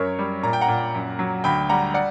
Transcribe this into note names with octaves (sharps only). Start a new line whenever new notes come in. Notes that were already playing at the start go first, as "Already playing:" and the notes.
Already playing: F#2 A#4 C#5
G3
A#2 A#5
G5
F#5 A#5
A#2
F#2
F#3
D2 G5 B5
G3 F#5 A#5
D5 F#5